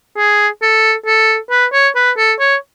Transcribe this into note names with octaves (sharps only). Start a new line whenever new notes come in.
G#4
A4
A4
B4
C#5
B4
A4
C#5